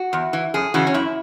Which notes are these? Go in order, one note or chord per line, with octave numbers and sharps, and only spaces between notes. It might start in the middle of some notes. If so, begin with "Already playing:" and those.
Already playing: F#4
E2
E3
F#2 G#4
C#3 E3 F#4
C#4
F#2 E4